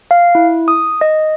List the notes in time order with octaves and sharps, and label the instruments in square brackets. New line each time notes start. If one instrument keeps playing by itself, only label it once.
[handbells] F5
E4
D#6
D#5